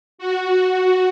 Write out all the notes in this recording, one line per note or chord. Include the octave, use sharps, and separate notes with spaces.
F#4